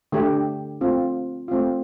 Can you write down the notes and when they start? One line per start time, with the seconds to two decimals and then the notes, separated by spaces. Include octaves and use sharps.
0.12 D3 A3 D4 G4
0.81 A3 C4 F4
1.48 A3 C4 F4